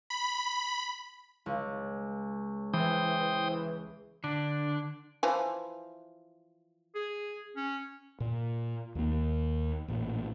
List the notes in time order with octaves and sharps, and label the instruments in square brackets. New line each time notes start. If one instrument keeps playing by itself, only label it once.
[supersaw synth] B5
[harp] C#2
[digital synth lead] E3 [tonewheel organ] C5 G5 D#6
[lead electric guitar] D3 [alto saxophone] D4
[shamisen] E3 F3 G#5
[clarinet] G#4
C#4
[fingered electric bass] A#2
D#2 A#3
A1 A#2